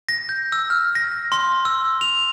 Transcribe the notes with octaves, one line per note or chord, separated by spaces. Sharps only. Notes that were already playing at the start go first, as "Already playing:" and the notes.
A#6
G6
E6
F6
A#6
C6
E6
F7